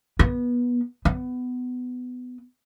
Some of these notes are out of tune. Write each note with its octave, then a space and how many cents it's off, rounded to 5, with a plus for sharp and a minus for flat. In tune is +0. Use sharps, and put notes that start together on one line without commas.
B3 -20
B3 +15